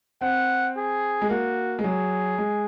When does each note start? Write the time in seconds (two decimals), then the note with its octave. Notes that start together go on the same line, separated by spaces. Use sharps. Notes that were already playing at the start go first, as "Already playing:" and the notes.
0.21 C4 F#5
0.76 G#4
1.22 G#3
1.30 A#3 F#4
1.79 G#3
1.84 F#3 G#4
2.38 G#3